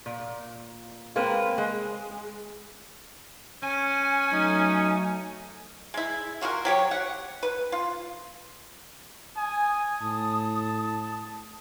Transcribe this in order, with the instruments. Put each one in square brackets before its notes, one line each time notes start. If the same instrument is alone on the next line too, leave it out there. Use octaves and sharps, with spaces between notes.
[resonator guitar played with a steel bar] A#2
G#3 A#3 C4 B4
G#3
[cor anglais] C#4 [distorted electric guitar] G#5
[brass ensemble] F#3 A3 [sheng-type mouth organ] D#4
[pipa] G#3 E4
F4 F#4 G#4 A#4
F#3 G4 C#5
F#5
B4
F4
[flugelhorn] G#5 [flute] D#6
[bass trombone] A2 [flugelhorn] A5